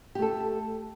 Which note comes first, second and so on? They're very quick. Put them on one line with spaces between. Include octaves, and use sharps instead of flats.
G4 A3 A4